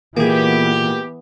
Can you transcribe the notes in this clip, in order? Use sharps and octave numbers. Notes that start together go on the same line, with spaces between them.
A#2 E3 A#3 B3 G4 G#4